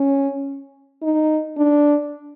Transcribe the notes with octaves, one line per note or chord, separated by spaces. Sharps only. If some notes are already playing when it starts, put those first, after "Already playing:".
Already playing: C#4
D#4
D4